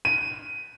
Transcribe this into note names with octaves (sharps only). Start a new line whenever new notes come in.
D#7